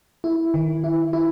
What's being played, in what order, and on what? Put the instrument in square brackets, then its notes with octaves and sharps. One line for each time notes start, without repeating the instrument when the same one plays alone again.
[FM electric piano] E4
D#3
E4
E4